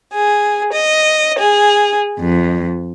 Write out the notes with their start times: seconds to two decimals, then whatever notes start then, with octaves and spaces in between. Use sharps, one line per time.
0.13 G#4
0.72 D#5
1.38 G#4
2.19 F2